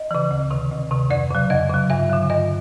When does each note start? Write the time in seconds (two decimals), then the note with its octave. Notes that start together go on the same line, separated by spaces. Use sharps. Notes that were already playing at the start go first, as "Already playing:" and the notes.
Already playing: D#5
0.11 C#3 E3
0.31 D2
0.50 C3 D#3
0.71 D2
0.91 C3 D#3
1.10 F2 D5
1.31 C#3 F#3
1.50 F2 D#5
1.70 C#3 F#3
1.90 G2 E5
2.10 D3 F#3
2.30 G2 D#5